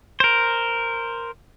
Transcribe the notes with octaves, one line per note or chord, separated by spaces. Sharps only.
A#4 C5